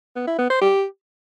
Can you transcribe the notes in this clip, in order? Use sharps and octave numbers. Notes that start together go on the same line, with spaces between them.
B3
E4
B3
C5
G4